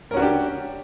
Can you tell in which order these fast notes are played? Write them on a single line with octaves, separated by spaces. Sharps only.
A#4 C#4 F#4 D4 G4